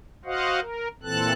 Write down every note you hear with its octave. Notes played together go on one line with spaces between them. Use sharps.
F#4 C5 D#5 F5 F#5
A#4
A#2 E3 C4 A4 A5 F#6